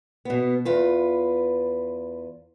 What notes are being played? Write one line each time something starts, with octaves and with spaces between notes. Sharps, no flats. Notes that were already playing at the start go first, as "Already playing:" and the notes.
B2 B3
E2 F4 B4